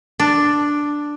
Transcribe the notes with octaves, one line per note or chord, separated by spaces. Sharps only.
D4